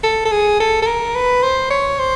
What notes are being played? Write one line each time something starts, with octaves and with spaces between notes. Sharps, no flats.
A4
A4
G#4
A4
A4
A#4
B4
C5
C#5
C5